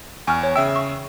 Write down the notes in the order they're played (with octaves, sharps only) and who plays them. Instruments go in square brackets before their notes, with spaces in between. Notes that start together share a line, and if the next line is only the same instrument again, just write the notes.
[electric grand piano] E2 C#6 [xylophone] G#5 F6
[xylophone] C#5
[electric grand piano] C#3 E5 E6 [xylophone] G5
[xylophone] C#6